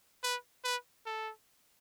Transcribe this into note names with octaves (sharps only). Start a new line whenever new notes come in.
B4
B4
A4